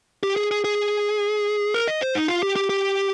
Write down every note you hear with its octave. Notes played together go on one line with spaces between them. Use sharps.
G4
G#4
G#4
G#4
A#4
D#5
C5
D#4
F4
G4
G4
G4